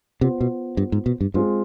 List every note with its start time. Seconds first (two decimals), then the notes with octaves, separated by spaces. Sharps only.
0.21 C3 B3 F4 C5
0.41 B2
0.77 G2
0.92 G#2
1.06 B2
1.21 G2
1.34 G2 G#3 C4 F4